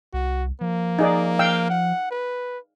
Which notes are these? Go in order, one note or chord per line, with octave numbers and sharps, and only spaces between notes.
C2 F#4
F3 A#3
D#4 G#4 D5
F5 G5 E6
F#5
B4